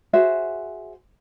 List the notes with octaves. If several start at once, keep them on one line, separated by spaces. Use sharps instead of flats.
F#4 G#4 C5 E5